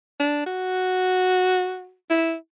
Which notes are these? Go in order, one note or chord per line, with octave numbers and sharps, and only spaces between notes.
D4
F#4
E4